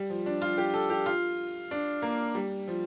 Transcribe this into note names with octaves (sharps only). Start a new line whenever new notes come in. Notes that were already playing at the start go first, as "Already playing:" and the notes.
Already playing: G3
F3
D4
F4
G4
A4
G4
F4
D4
A#3
G3
F3